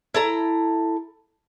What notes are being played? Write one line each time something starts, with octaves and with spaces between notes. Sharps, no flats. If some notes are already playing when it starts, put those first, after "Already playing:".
E4 A4 A#5